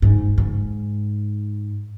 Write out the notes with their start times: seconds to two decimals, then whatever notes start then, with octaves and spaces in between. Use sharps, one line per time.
0.02 G#2
0.38 G#2